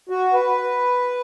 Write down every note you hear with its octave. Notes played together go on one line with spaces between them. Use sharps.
F#4
B4